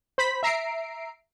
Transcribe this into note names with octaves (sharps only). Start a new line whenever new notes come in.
C5 B5 B6
E5 A#5 C7 D7